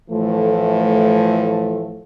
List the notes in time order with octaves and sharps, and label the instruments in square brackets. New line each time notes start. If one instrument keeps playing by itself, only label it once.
[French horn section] A2 E3 F3 A3